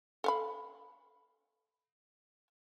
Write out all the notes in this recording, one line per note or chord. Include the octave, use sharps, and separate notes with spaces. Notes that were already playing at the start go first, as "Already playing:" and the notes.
A4 F5 B5